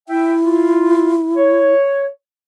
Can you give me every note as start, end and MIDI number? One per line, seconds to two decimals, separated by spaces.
0.09 1.73 64
0.09 0.33 76
0.09 0.33 79
0.44 1.15 65
1.37 2.06 73